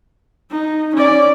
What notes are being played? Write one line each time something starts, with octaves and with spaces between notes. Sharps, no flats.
D#4
C#4 D5